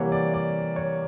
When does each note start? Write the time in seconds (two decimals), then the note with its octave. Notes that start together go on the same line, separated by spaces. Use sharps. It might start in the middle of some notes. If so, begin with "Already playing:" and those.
Already playing: C3 E3 G3 A#3 C#5 F5 F#5
0.12 D5
0.34 D5
0.76 C#5